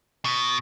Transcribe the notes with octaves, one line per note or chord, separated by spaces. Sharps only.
B2